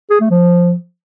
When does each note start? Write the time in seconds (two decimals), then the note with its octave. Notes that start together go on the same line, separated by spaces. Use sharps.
0.10 G#4
0.20 A3
0.30 F3